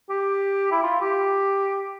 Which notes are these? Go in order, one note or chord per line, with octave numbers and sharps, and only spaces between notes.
G4
E4
F4
G4